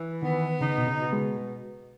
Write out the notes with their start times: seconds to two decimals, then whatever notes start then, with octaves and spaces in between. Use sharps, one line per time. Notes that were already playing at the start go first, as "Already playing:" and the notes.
Already playing: E3
0.22 D#3 B3
0.61 C#3 D#4
0.78 B2
0.87 C#3
1.00 B2
1.13 G#3